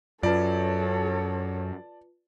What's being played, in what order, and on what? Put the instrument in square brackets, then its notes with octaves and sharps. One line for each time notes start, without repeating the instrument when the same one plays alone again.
[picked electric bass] F#2 [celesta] F4 B4 [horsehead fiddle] A4 C#5 [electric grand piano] D5 A5